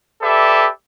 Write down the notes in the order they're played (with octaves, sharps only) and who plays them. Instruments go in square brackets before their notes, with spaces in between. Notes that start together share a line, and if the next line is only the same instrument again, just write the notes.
[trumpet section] G4 A4 B4 D5 E5